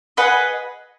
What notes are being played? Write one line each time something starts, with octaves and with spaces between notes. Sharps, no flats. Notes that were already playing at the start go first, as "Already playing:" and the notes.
G#4 B4 D#5 F#5